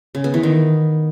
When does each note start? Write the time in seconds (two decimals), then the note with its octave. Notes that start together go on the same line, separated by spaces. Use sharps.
0.15 C#3
0.24 B3
0.34 E3
0.43 D#3